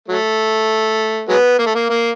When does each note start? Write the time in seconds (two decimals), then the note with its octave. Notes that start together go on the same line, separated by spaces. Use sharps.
0.09 F#3 A3
1.29 F#3 G#3 B3
1.59 A#3
1.66 A3
1.75 A#3
1.89 A#3